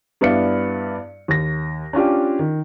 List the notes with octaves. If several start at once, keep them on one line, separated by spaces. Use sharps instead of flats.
G2 B3 E4 D5 F5 C#7
D#2 A#6
C#4 D4 F4 G4
D#3